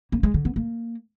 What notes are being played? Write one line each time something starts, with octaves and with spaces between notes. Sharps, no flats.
A#3
G#3
D3
B3
A#3